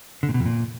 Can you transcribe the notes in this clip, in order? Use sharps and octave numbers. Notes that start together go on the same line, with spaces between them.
D3
A#2
B2
F2
A#2